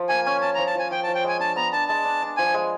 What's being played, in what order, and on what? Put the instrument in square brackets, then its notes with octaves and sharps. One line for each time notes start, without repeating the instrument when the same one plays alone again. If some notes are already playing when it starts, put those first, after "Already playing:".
Already playing: [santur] F3
[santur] A#3 [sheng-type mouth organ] G#5
[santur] C#4 [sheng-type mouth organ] G#5
[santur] C#4 [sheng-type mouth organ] A5
[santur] F3 [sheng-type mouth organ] A#5
[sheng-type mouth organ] A5
[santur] F3 [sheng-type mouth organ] G#5
[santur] F3 [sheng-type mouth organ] G5
[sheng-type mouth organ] A5
[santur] F3
[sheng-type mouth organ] G5
[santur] G#3 [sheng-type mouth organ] G#5
[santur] D4 [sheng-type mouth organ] A5
[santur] B3 [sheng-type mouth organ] A#5
[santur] D4 [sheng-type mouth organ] A5
[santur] G#3 [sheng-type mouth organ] A5
[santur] D4
D4
[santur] F3 [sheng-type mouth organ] G#5
[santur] G#3